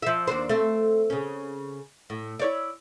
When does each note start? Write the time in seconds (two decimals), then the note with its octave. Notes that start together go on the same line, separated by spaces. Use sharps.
0.02 F3 E5
0.27 D#2 D4 C5
0.49 A3 C4
1.10 C#3 C#4
2.10 A2
2.39 E4 C#5 D5